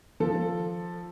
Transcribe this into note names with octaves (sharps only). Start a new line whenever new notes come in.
F3 A4